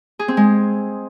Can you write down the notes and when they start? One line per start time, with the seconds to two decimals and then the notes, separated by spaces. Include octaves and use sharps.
0.19 G#4
0.28 C4
0.37 G#3